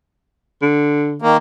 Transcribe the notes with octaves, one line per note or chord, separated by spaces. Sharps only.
D3
D#3 A#3